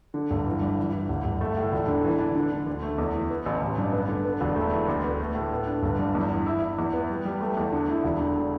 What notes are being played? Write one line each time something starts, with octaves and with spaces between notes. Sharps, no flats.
D3
G1
E3
G2
E3
E3
G1
G1
A3
A2
E1
D3
E3
D4
D3
D3
D2
A3
E2
E3
B3
A1
A1
G2
B3
D3
B3
E1
A3
E3
D2
B3
A3
A2
B3
D4
G1
G2
E2
E3
E4
E4
E2
B3
G3
G3
A3
E2
D3
E4
E1
D3